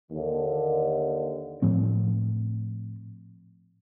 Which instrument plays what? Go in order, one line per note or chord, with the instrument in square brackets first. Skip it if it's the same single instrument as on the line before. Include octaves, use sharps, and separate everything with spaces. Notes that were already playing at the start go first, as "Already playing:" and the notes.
[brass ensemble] D#2 D3
[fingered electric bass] A2 F3 C4